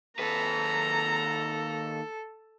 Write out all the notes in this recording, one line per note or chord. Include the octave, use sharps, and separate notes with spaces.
D#2 A4 B4 A#5